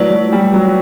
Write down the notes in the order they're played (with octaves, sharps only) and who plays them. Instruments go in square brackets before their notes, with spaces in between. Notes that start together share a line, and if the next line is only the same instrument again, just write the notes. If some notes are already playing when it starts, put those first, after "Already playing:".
Already playing: [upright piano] F#3 [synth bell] A3 E4 B4 D5
[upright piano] F#3
G3
F#3